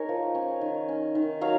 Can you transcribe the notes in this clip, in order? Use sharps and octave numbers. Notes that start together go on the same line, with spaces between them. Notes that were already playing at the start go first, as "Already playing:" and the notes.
Already playing: D#4 G#4 A#4 C#5
F3
C#4
D#3
C#4
D#3
F#3 C#5 F5